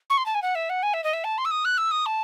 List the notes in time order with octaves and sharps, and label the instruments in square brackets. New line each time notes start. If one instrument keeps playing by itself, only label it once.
[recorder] C#6
C6
A5
G#5
F#5
E5
F#5
G#5
E5
D#5
E5
A5
C6
E6
D#6
F#6
E6
D#6
A5